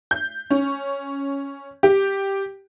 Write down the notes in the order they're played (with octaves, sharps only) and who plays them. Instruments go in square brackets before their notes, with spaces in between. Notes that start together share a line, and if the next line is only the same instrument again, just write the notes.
[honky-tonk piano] G6
C#4
G4